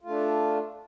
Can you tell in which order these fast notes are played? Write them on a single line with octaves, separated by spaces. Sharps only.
F4 A3 D4